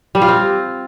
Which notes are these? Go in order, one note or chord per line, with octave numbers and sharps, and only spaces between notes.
G3
F4
C4